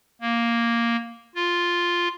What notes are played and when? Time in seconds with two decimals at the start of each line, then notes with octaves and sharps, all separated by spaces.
0.21 A#3
1.35 F4